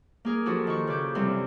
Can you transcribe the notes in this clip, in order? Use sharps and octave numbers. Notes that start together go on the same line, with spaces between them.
A#3 G#4 A#4
F3 D4 F#4 G4 A4
D#3 F4 C#6
C#3 B4 D6 G6
F#2 C3 E3 G3 C4